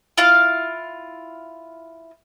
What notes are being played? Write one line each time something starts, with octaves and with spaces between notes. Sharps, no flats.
E4 F4 F5